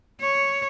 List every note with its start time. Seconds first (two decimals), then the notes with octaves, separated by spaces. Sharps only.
0.21 C#5